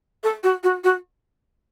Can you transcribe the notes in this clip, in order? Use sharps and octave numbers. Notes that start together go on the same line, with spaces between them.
A4
F#4
F#4
F#4